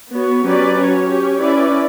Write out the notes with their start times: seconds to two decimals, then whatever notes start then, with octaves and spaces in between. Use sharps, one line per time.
0.11 B3 F#4 C#5
0.44 F#3 C#4 G4 B4 D5
0.76 C#4 F#4 C#5
1.07 C#4 G4 C#5
1.39 C#4 E4 B4 D5